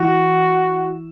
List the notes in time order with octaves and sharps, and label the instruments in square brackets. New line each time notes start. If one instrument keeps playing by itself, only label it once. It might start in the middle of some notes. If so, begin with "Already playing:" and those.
Already playing: [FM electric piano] E3 E4 [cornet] F#4